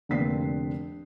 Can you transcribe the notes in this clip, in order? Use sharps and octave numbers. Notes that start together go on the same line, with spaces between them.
F1 D3 A#3 C4 B6 C7